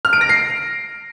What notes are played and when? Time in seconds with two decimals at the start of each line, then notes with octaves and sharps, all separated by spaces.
0.05 F6
0.13 D7
0.21 A#6
0.29 C7